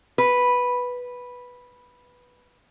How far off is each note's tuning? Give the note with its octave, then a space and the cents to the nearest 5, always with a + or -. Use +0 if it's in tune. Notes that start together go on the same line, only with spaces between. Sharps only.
B4 -5